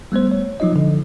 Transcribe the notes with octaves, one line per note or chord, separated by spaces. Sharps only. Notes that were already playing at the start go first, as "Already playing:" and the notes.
G3 A3 B3 C5
C#5
F3 F#3 D#4 F4 D#5
D3 F3